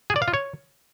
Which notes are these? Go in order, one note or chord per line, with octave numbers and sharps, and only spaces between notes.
G#4
D5
F5
F4
C#5